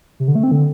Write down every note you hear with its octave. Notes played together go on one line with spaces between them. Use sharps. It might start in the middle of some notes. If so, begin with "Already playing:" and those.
C3
D3
A3
C4
D3